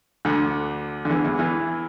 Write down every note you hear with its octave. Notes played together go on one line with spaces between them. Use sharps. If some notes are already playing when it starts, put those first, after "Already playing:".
D2 D3
D3
E2 E3
E2 E3
E2 E3